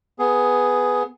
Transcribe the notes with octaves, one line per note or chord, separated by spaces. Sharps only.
B3 G#4